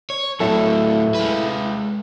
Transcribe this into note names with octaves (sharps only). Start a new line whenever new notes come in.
C#5
A2 F#3 E4 A4
G#3 B4